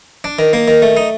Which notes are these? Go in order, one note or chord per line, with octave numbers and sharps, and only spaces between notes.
D4
D#3
A#3
D#3
A3
D#4